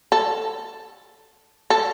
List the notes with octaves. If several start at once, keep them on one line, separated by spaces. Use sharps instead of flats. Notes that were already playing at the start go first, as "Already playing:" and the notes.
A4
A4